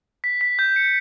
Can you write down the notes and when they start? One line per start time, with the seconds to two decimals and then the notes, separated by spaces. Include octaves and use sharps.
0.24 B6
0.41 B6
0.59 G6
0.76 C#7